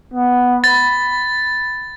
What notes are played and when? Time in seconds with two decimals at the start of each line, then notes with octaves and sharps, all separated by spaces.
0.14 B3
0.64 B5 A6